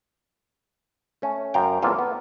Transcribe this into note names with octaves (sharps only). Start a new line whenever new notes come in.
A3 C#4
F#2 A#4 F5 G5
E2 A#3 C4 F4 A4
B3